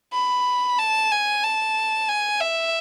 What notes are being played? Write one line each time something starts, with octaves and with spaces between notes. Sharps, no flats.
B5
A5
G#5
A5
G#5
E5